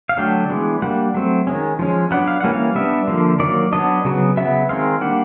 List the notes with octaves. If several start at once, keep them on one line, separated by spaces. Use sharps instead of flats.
F5
D3 F#3 A3 D4 G5
E3 G#3 B3 D4
G3 A#3 D4 F#5
F#3 A3 C4
D#3 G#3 C#4
F3 G#3 C#4
F#3 B3 D4 F#5
F5
E3 G3 A#3 C#4 F#5
F5
G3 B3 D4 E5
D3 F3 A#3
D#3 F#3 A#3 D5
F#3 B3 D4 D#5
C#3 F#3 B3
C#3 F#3 B3 E5
D#3 G#3 C4 F5
G3 A#3 D4 F#5